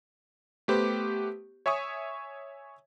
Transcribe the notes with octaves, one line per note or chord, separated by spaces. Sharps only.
A3 B3 G4 B4 C5
C#5 E5 G#5 C#6 D#6